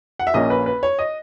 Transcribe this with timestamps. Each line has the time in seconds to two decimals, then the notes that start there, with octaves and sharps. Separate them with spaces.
0.19 F#5
0.27 E5
0.34 A#1 A#2 A#3 C#4 D#5
0.50 B4
0.66 B4
0.83 C#5
0.99 D#5